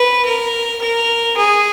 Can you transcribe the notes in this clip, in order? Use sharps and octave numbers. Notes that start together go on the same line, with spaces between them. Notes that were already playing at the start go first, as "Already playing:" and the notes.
Already playing: B4
A#4
A#4
G#4